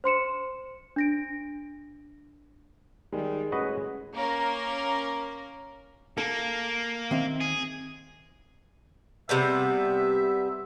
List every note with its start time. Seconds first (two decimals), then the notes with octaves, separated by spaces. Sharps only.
0.04 C5 C6 C#7 E7
0.96 D4 A#6 D7
3.12 D#3 G3 G#3
3.52 A2 C#4 F#4 B4 D#5
4.13 A#3 C#4 A#4
6.18 A#3 A4
7.11 D#3 C4 E5
7.41 G#4
9.29 C3 G3 B3 E5